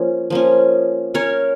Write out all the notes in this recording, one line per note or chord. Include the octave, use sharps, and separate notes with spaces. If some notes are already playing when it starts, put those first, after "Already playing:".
Already playing: F3 A#3 C#4
F3 A#3 C#4
C#4 A#4 C#5